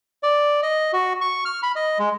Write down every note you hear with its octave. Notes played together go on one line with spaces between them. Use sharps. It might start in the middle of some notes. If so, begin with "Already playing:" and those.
D5
D#5
F#4
C#6
F6
B5
D#5
G#3